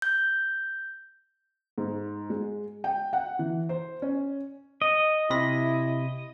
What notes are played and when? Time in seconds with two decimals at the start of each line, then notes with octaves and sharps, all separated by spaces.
0.02 G6
1.78 G#2
2.30 G#3
2.84 G5
3.13 F#5
3.39 E3
3.69 C5
4.02 C#4
4.82 D#5
5.30 C3 E4 B5 A#6